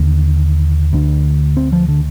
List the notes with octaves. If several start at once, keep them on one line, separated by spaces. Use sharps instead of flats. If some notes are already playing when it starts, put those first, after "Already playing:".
Already playing: D#2 D3
D2 D3
C4
F3
D3